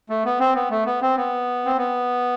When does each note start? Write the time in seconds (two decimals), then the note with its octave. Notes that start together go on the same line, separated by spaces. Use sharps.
0.10 A3
0.25 B3
0.40 C4
0.55 B3
0.70 A3
0.86 B3
1.02 C4
1.17 B3
1.65 C4
1.77 B3